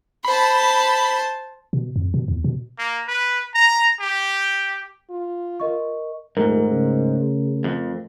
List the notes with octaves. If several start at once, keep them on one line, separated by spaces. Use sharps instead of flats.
C5 A5 B5
B2
F2
B2
E2
B2
A#3
B4
A#5
G4
F4
A#4 D#5 C#6
D#1 G#2 A3 A#4
C#3
F2